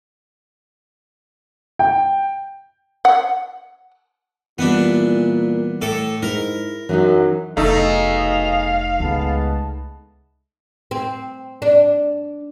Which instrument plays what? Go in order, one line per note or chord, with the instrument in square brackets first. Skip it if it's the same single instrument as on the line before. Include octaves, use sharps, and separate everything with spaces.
[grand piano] G5
[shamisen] F#5
[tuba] A#2 [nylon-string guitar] E3 G3 [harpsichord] B3 D4
[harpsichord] A2 A4 D6
[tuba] G#2 [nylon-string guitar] E4 [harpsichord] A#4
[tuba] F#2 [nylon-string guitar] E3 F#3 D#4
[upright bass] F1 [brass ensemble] B1 G#4 D#5 [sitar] A3 D#4 [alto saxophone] F5
[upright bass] C#2 [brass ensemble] G#3 B3 A5
[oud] C4
D4